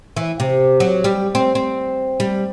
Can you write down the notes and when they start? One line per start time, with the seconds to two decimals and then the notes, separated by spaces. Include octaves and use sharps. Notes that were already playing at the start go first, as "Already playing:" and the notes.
0.17 E3
0.40 C3
0.80 F#3
1.04 G3
1.35 C4
1.55 C4
2.20 G3